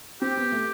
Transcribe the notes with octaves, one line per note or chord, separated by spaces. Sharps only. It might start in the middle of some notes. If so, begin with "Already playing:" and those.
C4 G4
B3
A3